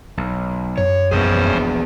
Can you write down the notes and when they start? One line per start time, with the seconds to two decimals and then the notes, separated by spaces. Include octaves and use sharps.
0.17 B1
0.78 F#2 C#5
1.11 E1 A#1 G2 B3 C#4 G#4 C5